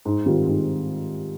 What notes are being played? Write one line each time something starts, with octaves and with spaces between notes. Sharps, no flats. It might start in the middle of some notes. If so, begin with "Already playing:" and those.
G#2
D#3 G3 C4 F4
G#2